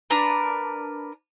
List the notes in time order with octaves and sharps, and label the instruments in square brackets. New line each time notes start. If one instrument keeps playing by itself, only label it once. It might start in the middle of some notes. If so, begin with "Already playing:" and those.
[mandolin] D4 A#4 B4